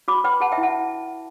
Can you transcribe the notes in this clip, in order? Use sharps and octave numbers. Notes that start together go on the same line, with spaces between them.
F#4 B5 D6
B4 G5 B5
G4 F#5 A5
E5 G5
E4
F#5 A5